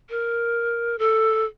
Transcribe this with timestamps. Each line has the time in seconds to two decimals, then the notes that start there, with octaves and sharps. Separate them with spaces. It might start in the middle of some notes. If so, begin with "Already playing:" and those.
0.10 A#4
0.99 A4